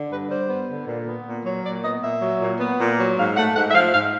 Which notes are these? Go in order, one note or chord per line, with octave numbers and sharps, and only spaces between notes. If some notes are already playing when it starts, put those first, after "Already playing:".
Already playing: D3
G2 B4
G3 C5
B3
D3
A#2
B3
A#2
F#3 C#5
A#2 D5
B3 D#5
A#2 E5
F#3
A#2
B3
A#2
F#3
G#2 F5
A3 F#5
G#2 F#5
E5
F3 F5
G#2 F5